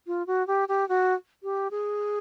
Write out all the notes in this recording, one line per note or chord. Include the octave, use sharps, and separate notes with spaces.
F4
F#4
G4
G4
F#4
G4
G#4